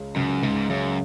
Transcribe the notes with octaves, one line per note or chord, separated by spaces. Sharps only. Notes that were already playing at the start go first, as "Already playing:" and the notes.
Already playing: C#2 C#3
C#2 F#2
C#2 G#2
F#2 C#3